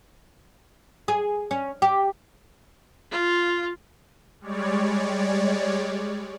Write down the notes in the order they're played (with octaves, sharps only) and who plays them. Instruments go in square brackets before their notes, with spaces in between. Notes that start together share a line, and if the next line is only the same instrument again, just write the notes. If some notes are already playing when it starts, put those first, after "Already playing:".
[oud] G#4
C#4
G4
[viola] F4
[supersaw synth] G3 G#3 C#5 D5